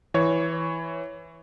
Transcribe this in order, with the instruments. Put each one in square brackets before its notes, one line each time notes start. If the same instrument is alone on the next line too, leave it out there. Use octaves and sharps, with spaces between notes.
[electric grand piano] E3 C#5